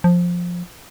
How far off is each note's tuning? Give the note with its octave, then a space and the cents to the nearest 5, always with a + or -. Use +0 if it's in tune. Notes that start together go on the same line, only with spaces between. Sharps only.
F3 +10